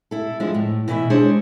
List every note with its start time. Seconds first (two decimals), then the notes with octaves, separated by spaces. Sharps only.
0.11 E4 A4
0.40 F3 G#3 D4 E4
0.54 A2
0.88 B2 E3 E4 D5 E5
1.10 G#3 D4 G#4 C5 C#5